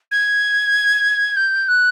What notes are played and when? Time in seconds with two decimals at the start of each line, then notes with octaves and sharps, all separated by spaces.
0.11 G#6
1.36 G6
1.68 F#6